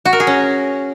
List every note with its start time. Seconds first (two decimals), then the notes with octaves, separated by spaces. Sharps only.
0.05 F#4
0.13 A#4
0.20 G#4
0.27 C#4